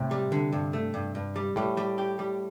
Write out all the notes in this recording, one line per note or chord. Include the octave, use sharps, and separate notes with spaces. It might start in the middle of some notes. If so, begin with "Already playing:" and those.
Already playing: A2 C3
G3
D3
G2
A3
G2
G2
G3
A2 G3
G3
G4
G3